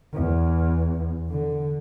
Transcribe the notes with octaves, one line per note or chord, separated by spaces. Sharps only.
E2
D3